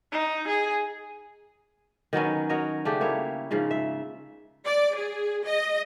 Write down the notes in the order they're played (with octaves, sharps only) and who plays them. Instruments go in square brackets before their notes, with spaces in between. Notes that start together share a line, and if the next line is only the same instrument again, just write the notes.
[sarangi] D#4
G#4
[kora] D#3 F#3 B3 C#4
F#4 A#4 C#5 D#5
C#3 A3 D4 G4
A#3 E4 C#5
G#2 C#3 F3 A#3
E5
[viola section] D5
G#4
D#5